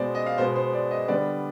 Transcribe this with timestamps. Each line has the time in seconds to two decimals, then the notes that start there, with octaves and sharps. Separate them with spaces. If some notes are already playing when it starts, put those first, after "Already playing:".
Already playing: B2 G#3 B3 C5 D5
0.15 D#5
0.26 F5
0.38 B2 G#3 B3 C5
0.56 C5
0.73 D5
0.91 D#5
1.08 D3 G3 B3 D5